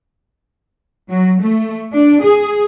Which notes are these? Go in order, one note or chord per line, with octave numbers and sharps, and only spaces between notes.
F#3
A3
D4
G#4